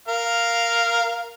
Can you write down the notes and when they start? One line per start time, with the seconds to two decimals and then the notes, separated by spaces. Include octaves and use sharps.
0.08 A#4 F5